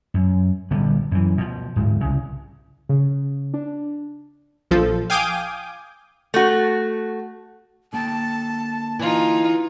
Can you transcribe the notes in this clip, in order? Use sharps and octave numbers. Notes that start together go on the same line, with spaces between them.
F#2
A#1 D3 G3 B3
F#2 E3
B2 F3
D1 G#2
C2 C#3
C#3
D4
A#1 F3 A4
F5 G5 G#5 D6 D#6 G6
A3 F#4
D3 A#3 G5 A5
E3 D#4 F4